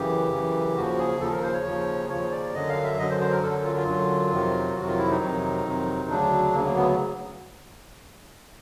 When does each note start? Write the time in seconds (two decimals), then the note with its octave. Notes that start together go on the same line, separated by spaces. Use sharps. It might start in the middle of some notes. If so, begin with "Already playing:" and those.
Already playing: F#2 C#3 E3 G4
0.31 F#2 C#3 E3
0.76 D#2 C#3 F3 F#4
0.98 G#4
1.20 D#2 C#3 F3 A4
1.32 A#4
1.42 C5
1.54 C#5
1.65 D#2 C#3 F3
2.09 D#2 C#3 F3 C#5
2.31 D5
2.54 F#2 D3 F#3 D#5
2.69 F5
2.83 E5
2.98 F#2 D3 F#3 D#5
3.10 C5
3.20 C5
3.32 A#4
3.43 F#2 D3 F#3 A4
3.65 F4
3.76 F4
3.87 F#2 D3 F#3
4.32 F2 C3 D#3 F#3
4.76 F2 C3 D#3 F#3 F#4
4.88 F4
4.98 E4
5.10 D#4
5.21 F2 C3 D#3 F#3
5.65 F2 C3 D#3 F#3
6.09 D2 C#3 F#3 D4
6.54 D2 C#3 F#3 A#3
6.65 A#3
6.76 B3